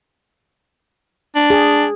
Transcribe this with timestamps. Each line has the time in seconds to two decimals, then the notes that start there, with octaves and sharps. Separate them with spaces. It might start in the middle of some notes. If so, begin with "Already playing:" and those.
1.35 D4
1.50 G#4